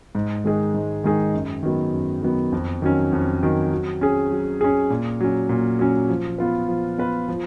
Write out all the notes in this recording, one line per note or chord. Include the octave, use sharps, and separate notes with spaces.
G#2
D#3 G#3 D#4 G#4
G#2
D#3 G#3 D#4 G#4
F#2
D#3 F#3 B3
F#2
D#3 F#3 B3
F2
D#3 F#3 C#4
F2
D#3 F#3 C#4
F#3
C#4 G#4
F#3
C#4 G#4
A#2
F#3 C#4
A#2
F#3 C#4
F3
B3 F4 B4
F3
B3 F4 B4
F3